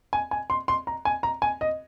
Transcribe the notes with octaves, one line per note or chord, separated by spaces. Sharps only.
G#5
G#5
C6
C6
A#5
G#5
A#5
G#5
D#5